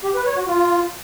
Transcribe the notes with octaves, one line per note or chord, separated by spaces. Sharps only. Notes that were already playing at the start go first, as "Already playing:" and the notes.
G4
B4
C#5
F#4
F4